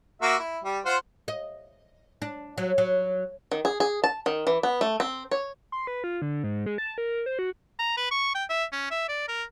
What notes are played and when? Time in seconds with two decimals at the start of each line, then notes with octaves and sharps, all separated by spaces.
0.22 A#3 F#4 E5
0.39 E4
0.64 G3
0.86 F4 C5 F#5
1.28 D#5
2.22 D4
2.58 F#3
2.78 F#3
3.52 D#3
3.65 G#4
3.80 G#4
4.04 A5
4.26 D#3
4.47 E3
4.63 B3
4.81 A3
5.00 C4
5.31 C#5
5.72 C6
5.87 B4
6.04 F4
6.22 D3
6.44 G#2
6.66 G#3
6.78 A5
6.98 A#4
7.26 C5
7.39 F#4
7.79 A#5
7.97 B4
8.11 C#6
8.35 G5
8.50 E5
8.72 C#4
8.91 E5
9.09 D5
9.28 A#4